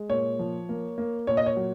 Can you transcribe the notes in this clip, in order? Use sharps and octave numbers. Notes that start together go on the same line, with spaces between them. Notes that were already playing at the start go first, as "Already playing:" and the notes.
Already playing: G#3
A#2 C#5
F3
A#3
A#3
A#2 C#5
D#5
C#5
F#3